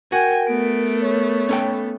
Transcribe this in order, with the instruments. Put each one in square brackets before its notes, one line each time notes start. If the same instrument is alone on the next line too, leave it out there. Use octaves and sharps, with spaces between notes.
[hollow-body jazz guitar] F#4 [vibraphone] A#4 [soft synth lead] G5 [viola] G#5
[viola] A3 B3 [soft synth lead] D7
[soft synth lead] C#5
[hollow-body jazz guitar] C#4 A4 G5